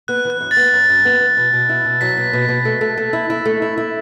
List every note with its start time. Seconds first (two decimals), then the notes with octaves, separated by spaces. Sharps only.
0.08 B3 F#6
0.25 E3
0.30 F#6
0.40 F#2
0.51 A6
0.57 B3
0.73 F#2
0.89 F#2
1.05 B3
1.20 E3
1.37 B2
1.53 B2
1.69 E4
1.85 B2
2.01 F#3 B6
2.18 B2
2.33 B2
2.49 B2
2.65 A3
2.81 A3
2.97 A3
3.13 E4
3.30 E4
3.46 A3
3.62 E4
3.77 E4